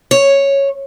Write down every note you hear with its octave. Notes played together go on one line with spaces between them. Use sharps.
C#5